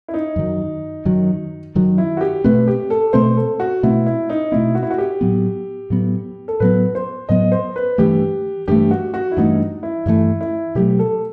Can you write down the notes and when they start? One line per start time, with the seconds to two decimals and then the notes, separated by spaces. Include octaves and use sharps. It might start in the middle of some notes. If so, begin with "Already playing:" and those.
0.08 E4
0.14 D#4
0.36 F#2 D#3 F#3
1.05 F#2 D#3 F#3
1.75 F#2 D#3 F#3
1.98 E4
2.17 F#4
2.21 G4
2.44 B2 A3 C4 B4
2.67 G4
2.90 A4
3.13 B2 A3 C4 C5
3.37 A4
3.60 F#4
3.83 B2 A3 C4 E4
4.06 E4
4.29 D#4
4.52 B2 A3 C4 E4
4.75 F#4
4.83 E4
4.90 F#4
4.98 G4
5.21 A2 F#3 B3
5.90 A2 F#3 B3
6.48 A4
6.60 A2 F#3 B3 B4
6.95 C5
7.29 A2 F#3 B3 D#5
7.52 C5
7.76 B4
7.98 G2 E3 A3 G4
8.68 G2 E3 A3 G4
8.91 F#4
9.14 F#4
9.32 E4
9.37 G2 E3 A3 D#4
9.83 E4
10.06 G2 E3 A3 E4
10.41 E4
10.75 B2 F#3 A3 G4
10.99 A4